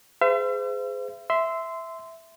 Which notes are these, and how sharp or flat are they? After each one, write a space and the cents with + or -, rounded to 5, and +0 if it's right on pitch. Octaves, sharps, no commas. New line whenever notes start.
G#4 +5 C5 -35 E5 +45
E5 +0 C6 -15